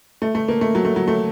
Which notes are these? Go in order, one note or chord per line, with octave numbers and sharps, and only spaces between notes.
A3
A3
A#3
A3
F#3
A3
F#3
A3